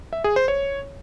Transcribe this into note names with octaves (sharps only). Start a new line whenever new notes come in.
E5
G#4
C5
C#5